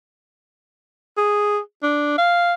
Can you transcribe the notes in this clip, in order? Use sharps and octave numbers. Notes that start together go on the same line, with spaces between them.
G#4
D4
F5